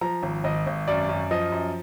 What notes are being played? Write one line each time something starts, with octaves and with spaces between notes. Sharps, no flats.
F3 A#5
G#1
G#1 D#5
G#1
F#2 D5
F#2
F3 D#5
F#2